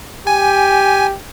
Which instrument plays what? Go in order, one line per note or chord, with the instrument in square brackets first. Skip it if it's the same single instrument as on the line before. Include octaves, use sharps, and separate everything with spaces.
[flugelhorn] G4 [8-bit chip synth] G#5